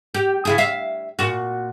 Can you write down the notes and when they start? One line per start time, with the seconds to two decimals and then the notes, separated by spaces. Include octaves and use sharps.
0.14 G4
0.45 C#3 E4 G#4
0.58 E5 F5
1.19 A#2 F#4